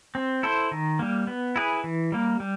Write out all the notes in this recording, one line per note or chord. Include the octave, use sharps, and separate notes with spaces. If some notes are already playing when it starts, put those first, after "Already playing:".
C4
E4 A4 C5
D#3
G3 A#3
B3
E4 G#4 B4
E3
G3 A#3
G3